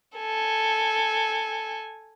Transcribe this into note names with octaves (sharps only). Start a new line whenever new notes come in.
A4 G#5